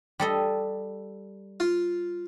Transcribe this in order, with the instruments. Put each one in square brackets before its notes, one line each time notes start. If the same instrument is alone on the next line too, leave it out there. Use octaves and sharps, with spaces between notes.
[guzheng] G3 A4 D#5
[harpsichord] F4